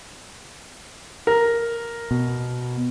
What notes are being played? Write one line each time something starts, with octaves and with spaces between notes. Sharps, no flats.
A#4
B2